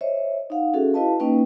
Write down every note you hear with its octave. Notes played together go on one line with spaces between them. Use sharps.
C5 C#5 D#5 E5
D#4 F5 F#5
C#4 F#4 G#4 A4 E5
E4 F#4 B4 D#5 F5 A5
A#3 C#4 D#4 B4 D#5 G5